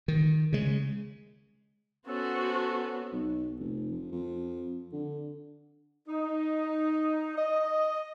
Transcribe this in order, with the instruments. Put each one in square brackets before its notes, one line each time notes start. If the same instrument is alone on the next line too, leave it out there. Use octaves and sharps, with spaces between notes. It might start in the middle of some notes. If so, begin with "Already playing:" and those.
[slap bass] D#3
C#3 G#3
[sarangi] B3 [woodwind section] C#4 A4 [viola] F#4 C5
[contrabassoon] B1
F1
F2
F2
D3
[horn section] D#4
D#5